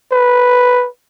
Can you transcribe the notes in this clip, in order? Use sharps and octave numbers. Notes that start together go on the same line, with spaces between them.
B4